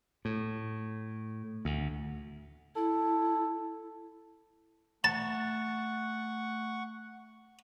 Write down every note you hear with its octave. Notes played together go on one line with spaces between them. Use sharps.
A2
D2
E4 A4
A3 F#5 A5 C#6